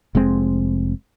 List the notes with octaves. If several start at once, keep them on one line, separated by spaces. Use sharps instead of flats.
F1 G#3 C4